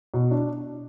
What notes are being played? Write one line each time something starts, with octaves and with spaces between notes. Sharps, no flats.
B2
D4